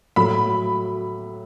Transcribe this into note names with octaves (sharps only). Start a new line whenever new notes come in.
A2 F#3 B5